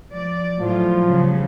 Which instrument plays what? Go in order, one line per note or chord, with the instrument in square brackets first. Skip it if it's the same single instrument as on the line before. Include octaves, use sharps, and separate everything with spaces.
[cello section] F3 D5
[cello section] A2 F#3 F4 [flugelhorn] F3
[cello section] C#3 F#3 G3